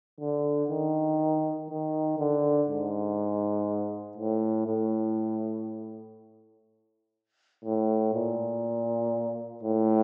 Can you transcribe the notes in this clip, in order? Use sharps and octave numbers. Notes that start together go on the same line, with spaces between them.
D3
D#3
D#3
D3
G#2
A2
A2
A2
A#2
A2